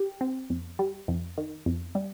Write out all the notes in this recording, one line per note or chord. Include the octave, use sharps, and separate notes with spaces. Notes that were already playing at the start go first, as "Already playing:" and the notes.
Already playing: G4
C4
F2
G3
F2
D#3
F2
G3